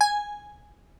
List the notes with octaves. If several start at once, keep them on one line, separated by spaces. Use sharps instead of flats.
G#5